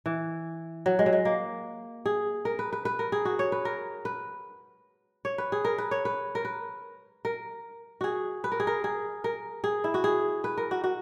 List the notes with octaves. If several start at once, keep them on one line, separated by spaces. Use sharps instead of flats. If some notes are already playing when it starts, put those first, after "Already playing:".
E3
F#3
G#3
F#3
G#3
A#3
G#4
A#4
B4
B4
B4
A#4
G#4
F#4
C#5
B4
A#4
B4
C#5
B4
G#4
A#4
B4
C#5
B4
A#4
B4
A#4
F#4 G#4
B4
A#4
G#4
A#4
G#4
A#4
G#4
E4
F#4
G#4
B4
A#4
F#4
F#4